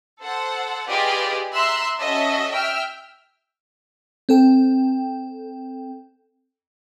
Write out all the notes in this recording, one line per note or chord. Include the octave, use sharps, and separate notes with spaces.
A4 C5 F#5
F4 G4 G#4 B4 D5 D#5
E5 A#5 C6 E6 F#6
C#4 F#4 A4 D#5 E5
E5 G5 E6 F6
C4 A4 G5